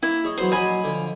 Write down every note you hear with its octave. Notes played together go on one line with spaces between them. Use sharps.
A#3 E4
G#4 C#5 D#5
E3 F#3 B3 C5
A#1 F#3 D#5 G#5 B5
D3 F3